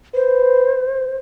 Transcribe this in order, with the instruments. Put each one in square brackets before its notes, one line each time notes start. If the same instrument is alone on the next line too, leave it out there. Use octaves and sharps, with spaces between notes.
[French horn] B4 [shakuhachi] C5